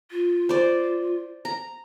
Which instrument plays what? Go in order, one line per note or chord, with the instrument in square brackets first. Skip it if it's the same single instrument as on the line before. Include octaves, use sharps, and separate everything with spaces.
[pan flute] F4
[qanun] C5 D5
A#5